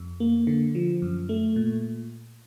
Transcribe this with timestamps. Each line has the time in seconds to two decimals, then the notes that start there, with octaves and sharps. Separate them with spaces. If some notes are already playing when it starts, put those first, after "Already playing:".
Already playing: F2
0.20 A#3
0.47 D3
0.75 F3
1.02 F#2
1.29 A3
1.56 A#2